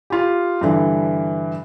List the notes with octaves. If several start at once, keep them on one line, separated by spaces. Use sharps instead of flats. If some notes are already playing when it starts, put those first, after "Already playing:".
F4 G4
G2 D3 E3